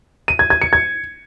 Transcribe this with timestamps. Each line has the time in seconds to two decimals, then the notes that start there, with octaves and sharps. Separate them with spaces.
0.28 D#7
0.39 G#6
0.50 G#6
0.62 C#7
0.73 G#6